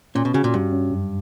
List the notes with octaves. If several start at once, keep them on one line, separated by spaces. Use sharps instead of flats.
A#2 C#4
B2
C#3 F#4
A#2
G2 G3
C#4
F#2